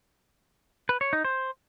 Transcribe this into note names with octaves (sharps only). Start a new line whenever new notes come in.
B4
C#5
D#4
C5